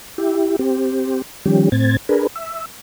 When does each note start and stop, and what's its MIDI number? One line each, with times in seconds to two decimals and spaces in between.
0.18 0.56 64
0.18 0.56 67
0.59 1.22 60
0.59 1.22 67
1.45 1.69 51
1.45 1.69 53
1.45 1.69 55
1.45 1.69 61
1.45 1.69 67
1.72 1.97 45
1.72 1.97 60
1.72 1.97 92
1.72 1.97 93
2.09 2.27 62
2.09 2.27 68
2.09 2.27 70
2.09 2.27 71
2.36 2.65 76